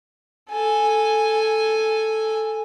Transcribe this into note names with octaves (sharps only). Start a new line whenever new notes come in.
A4 G#5